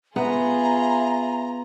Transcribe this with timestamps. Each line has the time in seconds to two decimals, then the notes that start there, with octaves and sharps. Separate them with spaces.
0.16 B3 F4 G#4 E5 A#5